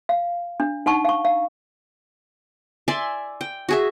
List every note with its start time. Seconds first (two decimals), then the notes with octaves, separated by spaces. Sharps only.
0.09 F5
0.60 D4
0.86 D#4 F#5 A5 C#6
1.05 F5 C#6
1.25 F5
2.88 D5 E5 G#5 C6
3.41 G5
3.69 F#4 G#4 E5